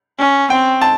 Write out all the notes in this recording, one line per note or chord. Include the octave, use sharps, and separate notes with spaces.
C#4
C4 G5
A5